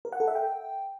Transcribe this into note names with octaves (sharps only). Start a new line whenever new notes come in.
A#4
F#5
A4
E5
G5